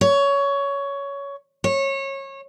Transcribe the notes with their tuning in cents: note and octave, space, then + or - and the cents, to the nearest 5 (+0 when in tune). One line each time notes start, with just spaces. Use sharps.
C#5 +15
C#5 -25